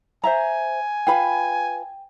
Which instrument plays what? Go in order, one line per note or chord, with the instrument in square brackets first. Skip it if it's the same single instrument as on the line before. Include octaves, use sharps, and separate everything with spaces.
[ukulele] C5 E5 A#5 [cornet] G#5
[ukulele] F4 B4 B5 [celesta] G5